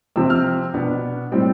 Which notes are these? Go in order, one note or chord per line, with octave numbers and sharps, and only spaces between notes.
C3 F3 C4 E6
F6
B2 B3 D4
A2 G3 C4 G5